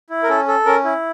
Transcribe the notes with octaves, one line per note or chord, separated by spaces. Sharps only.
E4
A#4
C#4 A4
A4
C#4 A#4
E4